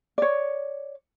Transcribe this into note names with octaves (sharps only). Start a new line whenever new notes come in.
C#5 D5